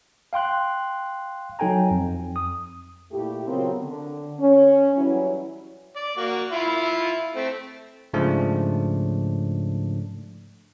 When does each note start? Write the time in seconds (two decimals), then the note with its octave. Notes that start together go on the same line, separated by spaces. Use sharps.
0.33 F5 G5 C6 F#6
1.59 F#3 D#4 A4 G5 G#5 A#5
1.91 F2
2.36 D#6
3.11 A#2 A3 E4 G4
3.47 C#3 F#3 B3 C4 F4 A#4
3.81 D3
4.39 C#4
4.96 E3 F#3 G3 C#4 E4
5.96 D5
6.17 A#3 F#4
6.52 E4 F4
7.35 A3 C4
8.13 G#2 C#3 F3 A3 D4